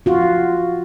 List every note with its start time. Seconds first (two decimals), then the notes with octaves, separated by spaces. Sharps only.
0.06 F4 F#4